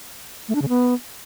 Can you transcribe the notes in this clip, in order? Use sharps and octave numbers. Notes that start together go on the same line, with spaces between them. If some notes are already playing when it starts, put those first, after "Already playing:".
A3
D4
C#3
B3